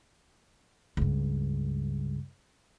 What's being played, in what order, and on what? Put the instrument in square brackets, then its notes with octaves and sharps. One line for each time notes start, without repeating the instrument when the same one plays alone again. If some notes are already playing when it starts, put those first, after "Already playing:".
[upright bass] C#2 G2